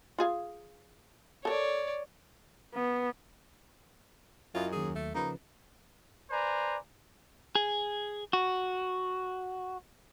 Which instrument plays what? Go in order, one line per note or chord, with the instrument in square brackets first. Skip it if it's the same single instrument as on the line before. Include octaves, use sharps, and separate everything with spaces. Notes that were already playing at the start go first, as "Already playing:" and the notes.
[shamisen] F4 G#4 F5
[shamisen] A4 A#4 [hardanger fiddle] C#5 D5
[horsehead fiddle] B3
[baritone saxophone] F#2 [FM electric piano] C#4 E4 D#5 [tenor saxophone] F4
[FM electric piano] D#2 F#3 [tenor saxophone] G#4
[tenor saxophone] A3
[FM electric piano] C#3 F3 B4 [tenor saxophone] A#3 [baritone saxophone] D#4
[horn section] B4 C5 D5 G#5 A#5
[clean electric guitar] G#4
F#4